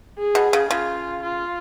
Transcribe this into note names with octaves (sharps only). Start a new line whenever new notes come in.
G#4
B2
C#3
C#3 F4
F4